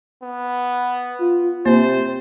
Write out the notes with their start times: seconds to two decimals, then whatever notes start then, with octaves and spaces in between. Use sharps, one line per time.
0.22 B3
1.21 F4
1.66 C3 A#3 C5